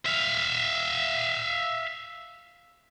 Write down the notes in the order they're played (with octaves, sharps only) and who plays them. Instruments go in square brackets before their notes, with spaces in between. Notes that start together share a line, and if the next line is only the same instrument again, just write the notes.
[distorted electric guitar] E5 F5